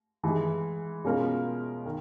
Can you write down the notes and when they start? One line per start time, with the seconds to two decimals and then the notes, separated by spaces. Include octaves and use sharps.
0.23 G#2 E3 G#3
1.04 B2 G#3 C#4 F4 A#4
1.85 D#3